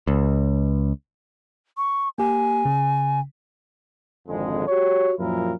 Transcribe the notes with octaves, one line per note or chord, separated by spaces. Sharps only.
C#2
C#6
A#3 G4 G#5
C#3
G#1 F2 D3 G#3
F#4 G4 C#5
F#2 A#2 F3 E4 A#4